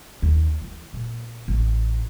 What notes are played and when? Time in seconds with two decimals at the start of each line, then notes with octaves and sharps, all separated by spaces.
0.22 D#2
0.61 E3
0.93 A#2
1.48 A1